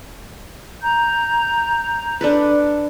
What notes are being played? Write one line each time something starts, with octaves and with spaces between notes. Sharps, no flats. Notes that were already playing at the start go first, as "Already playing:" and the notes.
A#5 G6
D4 A4 B4